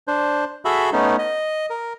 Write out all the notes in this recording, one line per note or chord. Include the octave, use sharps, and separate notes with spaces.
D4 C5
F#4 G#4 A4 E5 B5
A3 B3 C#4 D#4
D#5
A#4